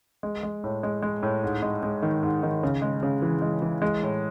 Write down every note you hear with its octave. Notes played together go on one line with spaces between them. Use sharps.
G#3
G#3
A2
G#3
G#3
A2
G#2
G#3
G#3
D#3
G#2
D#3
C#3
G#3
C#3
E3
G#3
E3
G#3
A2